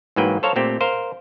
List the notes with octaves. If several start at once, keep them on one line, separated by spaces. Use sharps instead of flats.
G#2 E3 F#3 A#3 B4 G5
A4 C5 C#5 F5 A5 A#5
A#2 A3 C4 G4
A#4 C5 F5